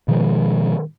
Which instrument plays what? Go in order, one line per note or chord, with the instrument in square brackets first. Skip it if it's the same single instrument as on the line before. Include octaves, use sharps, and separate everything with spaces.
[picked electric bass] B2 D#3 F3 G#3